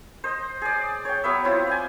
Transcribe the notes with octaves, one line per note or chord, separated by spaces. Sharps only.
C5 D#5
G#4 D5
C#5 G5
F#3 B3 E5
C4 E4 F4
D5 G5 G#5